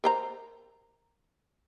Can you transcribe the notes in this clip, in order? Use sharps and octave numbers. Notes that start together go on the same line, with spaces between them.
A#4 C5 A#5